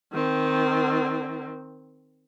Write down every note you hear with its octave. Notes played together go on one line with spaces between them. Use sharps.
D#3 C4